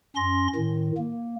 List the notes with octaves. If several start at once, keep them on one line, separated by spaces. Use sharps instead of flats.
F#2 C#4 C6 A#6
A2 D#3
A#3